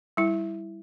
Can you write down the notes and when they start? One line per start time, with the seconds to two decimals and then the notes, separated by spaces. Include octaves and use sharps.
0.17 G3 E4